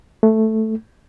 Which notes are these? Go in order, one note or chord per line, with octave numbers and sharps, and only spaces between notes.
A3